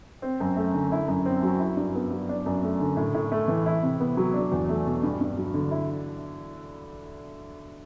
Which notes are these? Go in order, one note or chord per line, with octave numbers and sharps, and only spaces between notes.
C4
F#2
A3
D3
E4
F#2
C4
F#3
E4
G2
B3
F#3
D4
F#2
A3
D3
A2
A2
A3
E3
E4
C3
B3
F#3
D4
E2
A3
B2
G2
G2
F#3
D3
E4